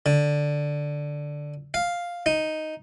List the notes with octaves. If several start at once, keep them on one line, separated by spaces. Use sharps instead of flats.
D3
F5
D#4